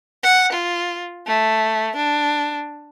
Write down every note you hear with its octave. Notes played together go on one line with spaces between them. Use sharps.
F#5
F4
A3
D4